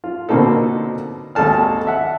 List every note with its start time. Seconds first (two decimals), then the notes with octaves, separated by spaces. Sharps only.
0.04 F4
0.29 B2 D3 A#3 C4 D#4 A4
1.35 G#1 D#2 A4 A5 F6
1.87 E5 F#5